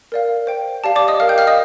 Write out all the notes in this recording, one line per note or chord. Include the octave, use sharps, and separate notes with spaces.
A#4 D5 F5
C5 G5
G4 D5 F5 A5
D5 D6
D#5 D#6
A#4 F5 F6
G5 G6
F5 F6
D#5 D#6